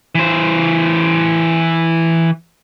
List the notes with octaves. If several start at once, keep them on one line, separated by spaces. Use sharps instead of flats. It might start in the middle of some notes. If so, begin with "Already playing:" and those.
E3 C5